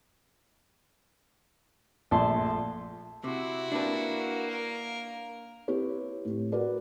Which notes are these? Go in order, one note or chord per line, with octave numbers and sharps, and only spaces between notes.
A#1 A3 A5 C6
C3 E4 F#4
A#3 D4 B4
A#4
C4 E4 G4 B4 C#5
A2
F#4 G#4 A#4 B4 D5